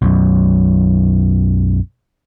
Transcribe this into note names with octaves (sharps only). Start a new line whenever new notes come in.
B1 F#2